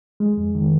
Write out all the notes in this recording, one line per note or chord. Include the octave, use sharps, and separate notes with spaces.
G#3
F2
D#3